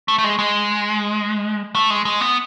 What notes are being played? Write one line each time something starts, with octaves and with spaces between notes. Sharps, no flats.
A3
A3
G#3
G#3
A3
G#3
G#3
B3